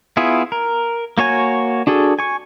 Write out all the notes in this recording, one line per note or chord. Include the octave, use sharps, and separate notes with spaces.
B3 E4 F4 G#4
A#4
A#3 F#4 C#5 G#5
D4 F#4 G#4 A4
G#5 C#6